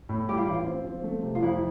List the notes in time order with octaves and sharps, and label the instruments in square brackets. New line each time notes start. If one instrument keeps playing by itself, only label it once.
[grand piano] A2
[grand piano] G3 [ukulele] G4
[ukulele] F4
[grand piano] A1 [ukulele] E4
[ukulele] F4
[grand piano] C4
F3
A3
C3
[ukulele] F4
[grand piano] F2 [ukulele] E4